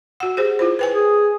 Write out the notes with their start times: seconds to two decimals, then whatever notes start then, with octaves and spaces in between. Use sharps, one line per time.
0.20 F#4 F#5
0.37 G4 G#4 C5
0.59 E4 F4 C5
0.79 B4 G5 G#5
0.93 G#4